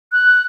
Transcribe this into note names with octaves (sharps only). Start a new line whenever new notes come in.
F#6